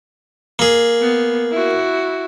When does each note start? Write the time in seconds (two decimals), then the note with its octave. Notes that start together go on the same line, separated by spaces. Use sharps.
0.59 A#3 G#4
1.01 B3
1.52 E4 F#4